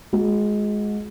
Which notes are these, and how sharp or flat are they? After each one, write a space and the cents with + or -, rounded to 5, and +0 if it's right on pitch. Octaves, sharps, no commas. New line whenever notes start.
G#3 +10 F#4 -35